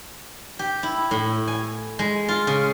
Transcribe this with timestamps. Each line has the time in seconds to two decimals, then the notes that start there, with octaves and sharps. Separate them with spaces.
0.59 G4
0.83 E4
1.11 A2
1.48 G#5
1.99 G#3
2.28 F4
2.47 C#3